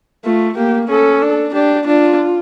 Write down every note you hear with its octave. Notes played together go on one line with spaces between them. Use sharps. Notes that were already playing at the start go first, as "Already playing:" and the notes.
A3 F4
A#3 G4
C#4 A4
D4
D4 G4
D4 F4